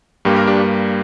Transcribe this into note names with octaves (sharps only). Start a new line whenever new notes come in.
G2 G3 A#3 G4
A#4
D4 G4